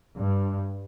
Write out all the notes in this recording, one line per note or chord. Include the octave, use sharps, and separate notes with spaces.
G2